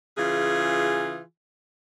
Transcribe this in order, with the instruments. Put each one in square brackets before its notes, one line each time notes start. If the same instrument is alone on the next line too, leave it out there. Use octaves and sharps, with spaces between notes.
[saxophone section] C#3 E3 F4 G#4